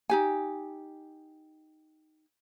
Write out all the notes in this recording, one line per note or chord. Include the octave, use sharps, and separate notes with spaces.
D#4 G4 G#5